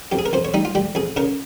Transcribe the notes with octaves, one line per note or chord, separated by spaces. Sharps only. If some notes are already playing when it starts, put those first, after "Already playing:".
F2 G4
G#4
A#4
F2 C5
C#5
G3 D#4
F4
G3 G4
F2 G#4
C#3 A#4